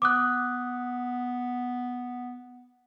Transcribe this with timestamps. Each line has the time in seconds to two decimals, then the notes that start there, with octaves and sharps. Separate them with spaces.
0.02 B3 D6 D#6 F#6